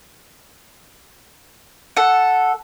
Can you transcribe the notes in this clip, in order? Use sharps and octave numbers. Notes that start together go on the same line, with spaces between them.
A4 F#5